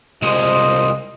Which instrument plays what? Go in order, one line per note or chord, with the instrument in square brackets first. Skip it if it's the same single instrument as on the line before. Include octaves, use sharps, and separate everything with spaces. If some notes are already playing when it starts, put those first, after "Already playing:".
[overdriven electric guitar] C2 G#3 [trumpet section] F4 C5 D#5